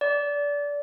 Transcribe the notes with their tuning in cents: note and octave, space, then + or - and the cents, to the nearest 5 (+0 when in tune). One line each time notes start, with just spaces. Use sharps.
D5 -25